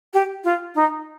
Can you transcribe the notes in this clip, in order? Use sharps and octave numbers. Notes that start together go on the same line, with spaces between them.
G4
F4
D#4